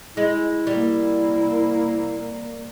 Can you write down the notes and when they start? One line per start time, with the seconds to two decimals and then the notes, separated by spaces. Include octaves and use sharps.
0.17 G#3 E4
0.67 C3 G3 A#3